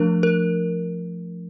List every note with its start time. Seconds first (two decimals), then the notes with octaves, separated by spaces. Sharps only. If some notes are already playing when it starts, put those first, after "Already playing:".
Already playing: F3 A3 D4 A#4
0.23 A#4